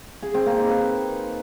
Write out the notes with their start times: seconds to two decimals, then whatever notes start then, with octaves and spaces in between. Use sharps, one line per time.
0.23 G#4
0.34 C4
0.46 A#3
0.58 D#4
0.70 B4